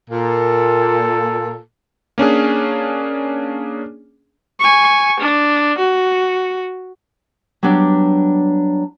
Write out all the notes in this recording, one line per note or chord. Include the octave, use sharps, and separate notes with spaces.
A#2 A4
A#3 C#4 D4 G#4
G#5 C#6
D4
F#4
F#3 G3 B3 D4 G4